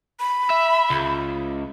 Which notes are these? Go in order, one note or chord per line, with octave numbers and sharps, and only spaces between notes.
B5
E5
C#2